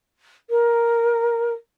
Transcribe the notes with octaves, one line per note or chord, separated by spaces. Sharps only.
A#4